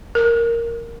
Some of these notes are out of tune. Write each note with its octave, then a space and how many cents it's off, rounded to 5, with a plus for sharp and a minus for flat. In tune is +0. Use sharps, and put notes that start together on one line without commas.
A#4 -5